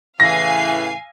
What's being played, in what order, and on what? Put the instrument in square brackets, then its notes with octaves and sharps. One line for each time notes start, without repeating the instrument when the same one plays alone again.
[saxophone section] A2 C#3 E3 [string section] F5 G#5 C7 [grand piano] A#6